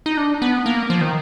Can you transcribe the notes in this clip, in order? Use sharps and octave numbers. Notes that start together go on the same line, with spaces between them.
D#4
D4
B3
A#3
F3
D#3